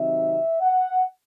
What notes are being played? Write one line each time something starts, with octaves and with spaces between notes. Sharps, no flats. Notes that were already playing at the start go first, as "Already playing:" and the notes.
Already playing: C3 D#3 F#3 C4 D#4 E5
F#5